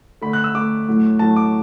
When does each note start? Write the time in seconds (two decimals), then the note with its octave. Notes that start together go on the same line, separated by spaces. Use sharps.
0.22 D3 A3 B5
0.33 F#6
0.44 E6
0.54 D3 A3 D6
0.88 A2 F#3 A3
1.19 A2 F#3 A3 A5
1.36 D6